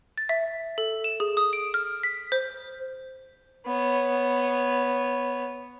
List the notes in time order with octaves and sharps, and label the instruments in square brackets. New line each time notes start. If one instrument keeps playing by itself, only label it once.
[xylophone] A6
E5
A4
E7
G#4
D#6
D7
F6
B6
C5
[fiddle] B3 C#5